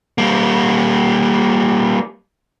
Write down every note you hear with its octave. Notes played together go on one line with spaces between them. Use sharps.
G3 A#3